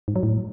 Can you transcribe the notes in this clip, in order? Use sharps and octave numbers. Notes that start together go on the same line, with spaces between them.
G#2
F#3
A2